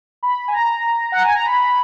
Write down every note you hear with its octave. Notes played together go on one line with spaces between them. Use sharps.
B5
G#5
A#5
F#5
G#5
A#5
B5